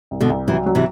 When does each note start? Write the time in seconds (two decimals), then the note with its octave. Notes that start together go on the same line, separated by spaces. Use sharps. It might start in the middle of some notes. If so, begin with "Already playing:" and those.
0.11 C2
0.20 B2 D3
0.30 C2
0.48 C3 E3 F#3
0.66 F#3
0.75 C3 E3